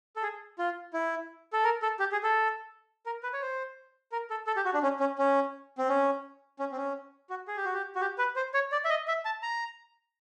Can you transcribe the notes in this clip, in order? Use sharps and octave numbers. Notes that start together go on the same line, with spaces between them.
A4
G#4
F4
E4
A4
A#4
A4
G4
G#4
A4
A#4
B4
C#5
C5
A#4
A4
A4
G4
F#4
D4
C#4
C#4
C#4
C4
C#4
C#4
C4
C#4
F#4
G#4
G4
F#4
G4
F#4
G4
B4
C5
C#5
D5
E5
D#5
E5
A5
A#5